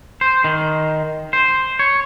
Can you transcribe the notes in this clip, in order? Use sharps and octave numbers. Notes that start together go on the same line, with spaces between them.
C5
D#3
C5
C#5